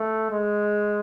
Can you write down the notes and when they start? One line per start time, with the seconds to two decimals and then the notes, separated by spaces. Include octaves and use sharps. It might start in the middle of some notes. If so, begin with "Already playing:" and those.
Already playing: A3
0.31 G#3